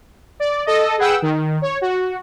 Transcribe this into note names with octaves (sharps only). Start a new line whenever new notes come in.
D5
A4 D#5
G#4 B4 F#5 G5 E6
D#3
C#5
F#4